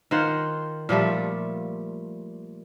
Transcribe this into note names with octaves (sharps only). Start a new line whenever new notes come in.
D#3 F4 C5 F#5
A#2 F3 G3 A3